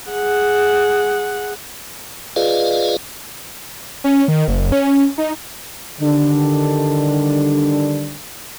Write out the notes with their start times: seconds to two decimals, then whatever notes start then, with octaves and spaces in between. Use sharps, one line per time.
0.10 G#4 F#5
2.36 F4 G#4 B4 D5 D#5 F5
4.04 C#4
4.28 D#3
4.48 F#1
4.72 C#4
5.18 D#4
6.00 D3 D#3 G3 D4